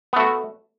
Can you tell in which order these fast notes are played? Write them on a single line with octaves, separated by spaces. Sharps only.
B3 A3 F#4